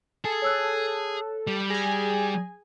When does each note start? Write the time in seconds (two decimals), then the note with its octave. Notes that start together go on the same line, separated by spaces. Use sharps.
0.25 G#4 A4
0.42 C#5 E6 F#6
1.47 G3
1.70 G#4 G#5 A#6